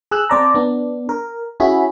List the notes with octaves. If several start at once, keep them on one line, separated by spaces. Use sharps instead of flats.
G#4 E6 F#6
C4 C5 D5 A5 A#5
B3 D4
A#4
C#4 E4 F#4 G#4 B5